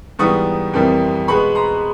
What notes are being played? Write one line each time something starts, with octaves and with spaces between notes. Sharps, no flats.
G#2 E3 G3 B3 C#6 D#6
F2 C3 E3 G3 A#3
B2 G#3 B3 B5 C#6
A#5 C6